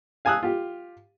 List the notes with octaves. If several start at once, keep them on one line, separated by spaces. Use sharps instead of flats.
F5 G#5 A5 D#6 E6 F#6
F4 G4